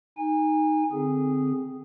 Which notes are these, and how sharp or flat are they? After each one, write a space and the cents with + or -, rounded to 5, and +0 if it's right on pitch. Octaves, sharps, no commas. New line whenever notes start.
D#4 +0 G#5 -25
D3 +0 C4 -10 G#4 -10